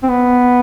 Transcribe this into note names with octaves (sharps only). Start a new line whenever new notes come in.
C4
B3